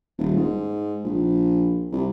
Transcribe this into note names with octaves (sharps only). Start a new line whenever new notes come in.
D#1
G#2
A#1
C2